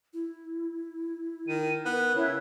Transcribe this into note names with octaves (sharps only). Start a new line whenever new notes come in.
E4
D#3 D#7
B3 A#4 F#6
C#3 E4 C#5